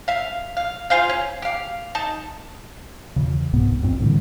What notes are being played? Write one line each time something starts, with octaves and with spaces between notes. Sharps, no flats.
E5 F5
F5
F4 G#4 C5 F5
C#4
G4 F5
D#4 A5
E2 C#3
C2 G#2 C3 B3
A1 F2 C4
A2 D3 E3 G3